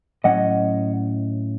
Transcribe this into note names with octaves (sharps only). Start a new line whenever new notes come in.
A2 F#3 C#4 D#5 F#5